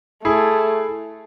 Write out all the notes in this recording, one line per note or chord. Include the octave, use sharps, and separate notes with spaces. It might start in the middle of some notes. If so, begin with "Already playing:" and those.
A3 E4 G#4